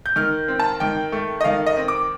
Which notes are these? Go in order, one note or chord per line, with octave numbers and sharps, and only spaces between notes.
G6
D#3 F6
C4
A5
D#3 G5
A3
D#5
D#3 F5
D#5
C4
D6